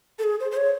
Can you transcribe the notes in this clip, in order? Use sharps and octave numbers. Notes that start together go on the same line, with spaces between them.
A4
G#4
C5
C5
C#5